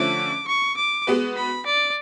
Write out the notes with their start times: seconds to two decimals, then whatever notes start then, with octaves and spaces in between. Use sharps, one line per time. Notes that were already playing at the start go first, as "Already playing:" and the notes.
Already playing: D3 F3 A3 C#4 D6
0.48 C#6
0.77 D6
1.07 G#3 B3 F#4 B4
1.36 B5
1.66 D5